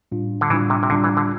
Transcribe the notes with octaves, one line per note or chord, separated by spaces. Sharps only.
A2 G3 D4 F4
D3
A2 E3 G3 D4 F4
C3
C3
A2 D3 G3 D4 F4
E3
D3